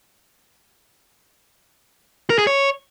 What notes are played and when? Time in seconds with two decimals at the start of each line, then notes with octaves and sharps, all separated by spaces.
2.30 A#4
2.38 G#4
2.47 C#5